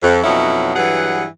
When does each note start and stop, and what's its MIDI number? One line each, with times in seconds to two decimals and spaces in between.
0.03 0.20 41
0.24 0.74 41
0.24 0.74 47
0.24 0.74 54
0.24 0.74 61
0.24 0.74 63
0.24 0.74 64
0.76 1.24 43
0.76 1.24 52
0.76 1.24 54
0.76 1.24 68
0.76 1.24 78